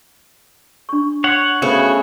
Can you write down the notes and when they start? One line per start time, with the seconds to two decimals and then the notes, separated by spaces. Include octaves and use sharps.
0.89 D4 C#6
1.24 C#5 F#5
1.62 C#3 A3 B3 F#4 A4 A#4 C5